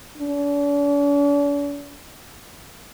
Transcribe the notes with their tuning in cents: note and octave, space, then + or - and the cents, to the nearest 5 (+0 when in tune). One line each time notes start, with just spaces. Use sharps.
D4 -45